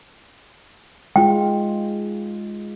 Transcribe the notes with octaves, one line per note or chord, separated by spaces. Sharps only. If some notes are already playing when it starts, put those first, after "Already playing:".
G#3 F4 G5